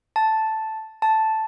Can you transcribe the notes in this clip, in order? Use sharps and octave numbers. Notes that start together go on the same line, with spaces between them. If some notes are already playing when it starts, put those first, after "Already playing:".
A5
A5